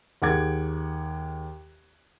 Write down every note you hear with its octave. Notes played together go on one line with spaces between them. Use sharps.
D#2 G#4 F#5 D6 G#6